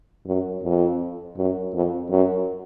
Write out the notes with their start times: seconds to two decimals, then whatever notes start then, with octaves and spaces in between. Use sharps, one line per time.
0.26 F#2
0.63 F2
1.37 F#2
1.74 F2
2.11 F#2